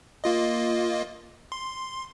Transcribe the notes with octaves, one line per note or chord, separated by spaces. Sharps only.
A#3 F4 D#5
C6